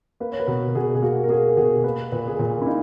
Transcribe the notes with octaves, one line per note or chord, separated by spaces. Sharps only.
A#3 B4
C#5
B4
B2 A#4
B2 G#4
G#4
A#3 F#4
A#4
A#3 G#4
B2 G#4
A#3 B4
A#2 B4
G#4
A#2 A#4
E4
A#3 D#4